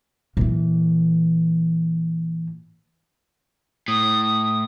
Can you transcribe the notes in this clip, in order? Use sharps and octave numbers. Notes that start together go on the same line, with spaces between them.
A#2 E3
A2 D#6